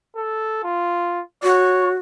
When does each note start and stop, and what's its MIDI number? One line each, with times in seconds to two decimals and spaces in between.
0.16 0.63 69
0.64 1.21 65
1.43 1.95 66
1.43 1.93 73